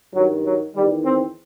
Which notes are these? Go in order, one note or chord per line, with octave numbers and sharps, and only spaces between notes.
G2 D#3 F#3
F#3
E2 D#3 G3
C4